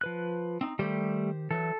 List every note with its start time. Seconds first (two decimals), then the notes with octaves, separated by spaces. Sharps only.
0.01 F3 B4 F#6
0.61 C4 D#4
0.79 D#3 G3 A3 G4 C5
1.51 E3 F#3 A4